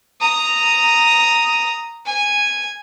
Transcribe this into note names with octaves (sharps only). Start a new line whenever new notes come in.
A#5 D#6
G#5